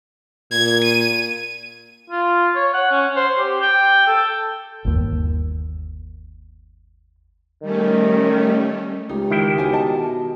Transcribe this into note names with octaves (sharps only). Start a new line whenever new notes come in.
A#2 G#6
D#7
F4
C#5
F#5
C#4
C5
G4
G5
A4
G1 D#2
D#3 G3 A3 C#4
C#2 D#4 G4
D#3 E4 G5
B2 C5 G#5
D#5 A5